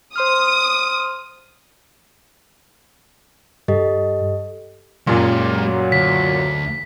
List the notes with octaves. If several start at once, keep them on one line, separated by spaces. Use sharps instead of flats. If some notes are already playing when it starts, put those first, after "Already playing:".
C5 C6 D#6 F6
G2 G4 A4 D#5
F#2 A#2 G#3 G4
F#3
D2 B6